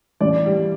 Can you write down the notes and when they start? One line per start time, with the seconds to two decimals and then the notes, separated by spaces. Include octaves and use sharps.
0.21 A1 D5
0.46 G3